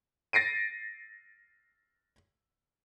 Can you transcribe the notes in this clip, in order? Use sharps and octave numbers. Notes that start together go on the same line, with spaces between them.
A6 A#6 C7 D7 D#7